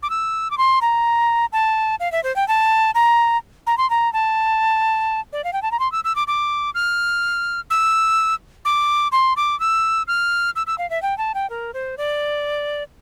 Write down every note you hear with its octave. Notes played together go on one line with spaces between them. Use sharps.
D6
E6
D6
C6
A#5
A5
F5
E5
C5
G5
A5
A#5
A#5
C6
A#5
A5
D5
F5
G5
A5
A#5
C6
E6
E6
D6
D6
F6
E6
D6
C6
D6
E6
F6
E6
E6
F5
E5
G5
A5
G5
A#4
C5
D5